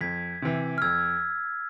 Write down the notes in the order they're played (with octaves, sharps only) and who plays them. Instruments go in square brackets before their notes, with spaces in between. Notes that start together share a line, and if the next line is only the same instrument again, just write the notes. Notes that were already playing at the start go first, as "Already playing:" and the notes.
[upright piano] F2 [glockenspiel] G#6 B6
[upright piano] C3 E3
[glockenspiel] F6
[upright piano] F2 [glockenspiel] E6 G#6